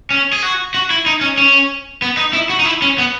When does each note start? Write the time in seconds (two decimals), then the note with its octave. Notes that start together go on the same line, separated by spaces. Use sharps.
0.11 C#4
0.33 G#4
0.43 F#4
0.74 F#4
0.90 E4
1.06 D#4
1.21 C#4
1.38 C#4
2.02 B3
2.17 D#4
2.33 E4
2.50 F#4
2.60 D#4
2.65 E4
2.82 C#4
2.98 B3